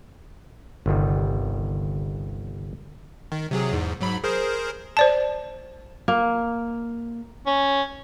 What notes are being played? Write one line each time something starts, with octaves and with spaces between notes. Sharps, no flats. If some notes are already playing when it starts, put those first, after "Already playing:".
G1 C2 D#3 G3
D#3
C3 F#3 G#4
E2 G#2
G#2 F#3 B5
G#4 A#4 C5
C5 D5 A5
A#3
C#4